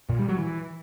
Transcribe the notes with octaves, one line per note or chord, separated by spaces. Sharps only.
A#2
G3
F#3
E3